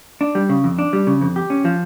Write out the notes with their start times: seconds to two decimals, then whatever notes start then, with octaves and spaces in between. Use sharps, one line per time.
0.21 D4
0.35 G3
0.49 C#3
0.64 F2
0.78 D4
0.93 G3
1.07 C#3
1.21 F2
1.36 G4
1.50 C#4
1.65 F3